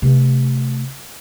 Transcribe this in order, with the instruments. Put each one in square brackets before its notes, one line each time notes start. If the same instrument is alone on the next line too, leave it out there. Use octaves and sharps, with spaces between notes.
[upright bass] C3 A3